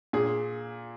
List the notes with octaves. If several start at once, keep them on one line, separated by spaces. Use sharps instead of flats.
A#2 G#4